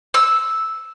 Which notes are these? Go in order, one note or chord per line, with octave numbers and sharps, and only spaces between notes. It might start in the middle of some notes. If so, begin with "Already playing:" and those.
E6